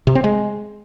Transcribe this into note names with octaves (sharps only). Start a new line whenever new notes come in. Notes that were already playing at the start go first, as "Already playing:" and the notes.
C3
C4
G#3